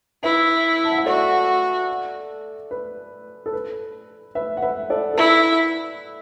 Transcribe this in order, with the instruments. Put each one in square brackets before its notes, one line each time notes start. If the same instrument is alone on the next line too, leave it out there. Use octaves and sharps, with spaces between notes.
[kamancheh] E4 [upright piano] B4 E5
[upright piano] A5
F#5
E5
[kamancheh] F#4 [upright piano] A4 D5
[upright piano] B4
A4
B4
B4 E5
F#5
B4 E5
A4 D5
A4
[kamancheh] E4 [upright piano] B4